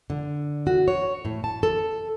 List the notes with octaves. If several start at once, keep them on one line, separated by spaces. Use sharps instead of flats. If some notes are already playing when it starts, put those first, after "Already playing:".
D3
F#4
C#5
A2
A5
A4